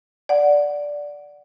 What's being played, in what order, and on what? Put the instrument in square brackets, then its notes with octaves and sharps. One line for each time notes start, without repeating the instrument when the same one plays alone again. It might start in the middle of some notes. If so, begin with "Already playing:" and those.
[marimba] D5 F#5